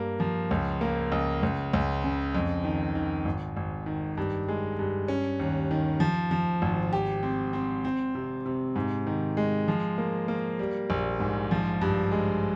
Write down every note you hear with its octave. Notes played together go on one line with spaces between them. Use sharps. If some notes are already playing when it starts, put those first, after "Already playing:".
Already playing: G2 A#3
F3
C#2
A#3
C#2
C#2
C#2
C#3
F2
D#3
D#3
G#1
G#1
D#3
G2
G#3
G2
C#4
D#2
D#3
F3
F3
G#1
G4
C4
C4
C4
C3
C3
G#2
D#3
G#3
F3
A#3
A#3
G3
A#1
G#2
F3
G2
G#3